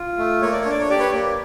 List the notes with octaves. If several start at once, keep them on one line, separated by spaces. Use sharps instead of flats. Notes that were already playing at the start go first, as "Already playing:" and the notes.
Already playing: F4
A3
A#3 C#5
D5
D4 C#5
D5
C#5
G4 D5
B4 C#5
A#3